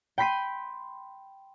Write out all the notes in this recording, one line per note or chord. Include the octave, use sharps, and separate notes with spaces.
G5 B5 C6 B6 C7 D#7